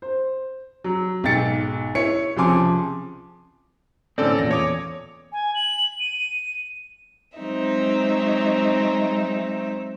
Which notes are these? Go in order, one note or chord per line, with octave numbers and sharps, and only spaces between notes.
C5
F#3
B1 G#2 G5 A6 C#7
E4 C#5 C#7
C2 C#3 F3 G#5 C6 D6
A2 D3 C4 C#4 A4 D5
E2 A#2 A#6
C#5 D6 D#6
G#5
F#7
D#7
F#3 G#3 C4 D#4 E5